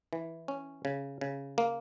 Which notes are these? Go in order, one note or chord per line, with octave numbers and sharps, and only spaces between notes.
E3
C#4
C#3
C#3
A#3